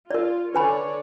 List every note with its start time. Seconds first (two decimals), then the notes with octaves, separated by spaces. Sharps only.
0.11 F4 A#4 D5
0.55 D3 B4 C#5 D5 G#5 B5